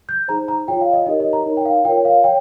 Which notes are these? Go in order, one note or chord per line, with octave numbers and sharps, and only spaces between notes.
G6
D#4 G#4 C5 A#5
A#5
F4 G#4 C#5 G5
F5
D#5
D#4 G4 A#4 C#5 D#5
D#5
A#5
D#4 A#4 C#5
G5
F5
F4 A#4 C#5 G5
F5
C#5 G5